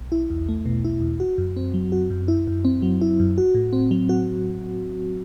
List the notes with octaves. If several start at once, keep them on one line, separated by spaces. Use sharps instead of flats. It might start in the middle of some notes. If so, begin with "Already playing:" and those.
Already playing: B1
E4
E2
A3
B2
E4
E2
F#4
F#2
C4
F#3
F#4
F#2
E4
F#2
C4
F#3
E4
F#2
F#4
A2
C4
F#3
F#4